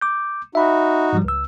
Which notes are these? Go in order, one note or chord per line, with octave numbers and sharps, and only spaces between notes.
D6 G6
D#4 F#4 E5 B5
G#2 F3 G3
C#2 E6